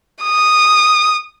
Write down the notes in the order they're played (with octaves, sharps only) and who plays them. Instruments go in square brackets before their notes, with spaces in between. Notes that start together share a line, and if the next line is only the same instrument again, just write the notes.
[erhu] D#6